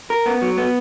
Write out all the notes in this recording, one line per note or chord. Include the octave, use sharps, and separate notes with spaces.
A#4
B3
F#3
B3